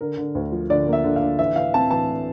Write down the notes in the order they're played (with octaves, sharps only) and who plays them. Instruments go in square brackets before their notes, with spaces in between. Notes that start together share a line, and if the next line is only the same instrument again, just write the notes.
[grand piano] D3 A#4
D3
D2
F3
D3 D5
A#3 E5
D3
F5
D3
E3 E5
E3 F5
C4 A5
E3 A5